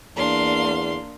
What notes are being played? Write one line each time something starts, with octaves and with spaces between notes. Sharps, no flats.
E2 A#3 D4 F5 C6